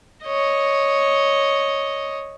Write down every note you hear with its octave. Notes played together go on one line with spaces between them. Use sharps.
C#5 D#5